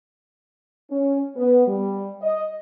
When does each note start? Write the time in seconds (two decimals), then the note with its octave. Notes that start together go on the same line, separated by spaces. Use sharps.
0.90 C#4
1.36 B3
1.67 G3
2.21 D#5